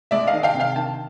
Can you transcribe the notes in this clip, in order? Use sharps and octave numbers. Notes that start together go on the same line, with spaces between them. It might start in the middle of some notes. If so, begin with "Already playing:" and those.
G#3 D5 E5
D#5 F5
D#3
F5 G5
C3
F5 G5
D#3 G5 A5